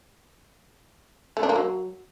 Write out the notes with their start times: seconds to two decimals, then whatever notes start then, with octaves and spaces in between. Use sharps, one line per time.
1.37 A3
1.43 D4
1.49 A#3
1.56 F#3